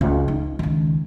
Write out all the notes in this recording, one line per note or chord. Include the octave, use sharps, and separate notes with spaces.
C#2
D#4
C#2 D#3